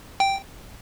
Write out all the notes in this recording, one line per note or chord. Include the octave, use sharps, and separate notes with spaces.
G5